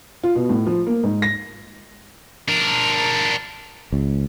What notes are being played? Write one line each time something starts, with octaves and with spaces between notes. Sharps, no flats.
F4
B2
A2
F3
A#3
G#2
A#6
D4 A#4
C#2